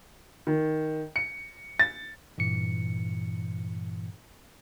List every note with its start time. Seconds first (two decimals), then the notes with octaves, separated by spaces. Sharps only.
0.47 D#3
1.16 C#7
1.79 A6
2.38 G2 A#2 E3 C#7